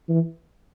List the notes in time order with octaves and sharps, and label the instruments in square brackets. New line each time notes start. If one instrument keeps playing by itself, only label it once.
[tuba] E3